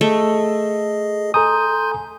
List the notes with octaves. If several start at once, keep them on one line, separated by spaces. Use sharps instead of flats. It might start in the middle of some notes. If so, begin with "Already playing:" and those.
A3 G#4 D#5
A4 G#5 A#5 C6 D#6 G6